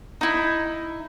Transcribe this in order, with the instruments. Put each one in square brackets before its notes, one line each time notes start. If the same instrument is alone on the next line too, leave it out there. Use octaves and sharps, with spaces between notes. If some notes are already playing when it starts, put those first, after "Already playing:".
[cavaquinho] D#4 E4